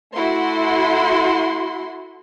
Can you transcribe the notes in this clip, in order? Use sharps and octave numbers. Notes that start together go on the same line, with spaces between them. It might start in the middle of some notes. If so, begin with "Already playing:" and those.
A3 E4 F#4 C6